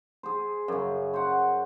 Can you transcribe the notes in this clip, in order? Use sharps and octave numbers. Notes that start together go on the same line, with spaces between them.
G#4 C5
F#2 C#3
C5 F#5